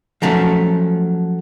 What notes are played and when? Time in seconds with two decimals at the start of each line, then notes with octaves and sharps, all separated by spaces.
0.22 F3 F#3 A3 C#4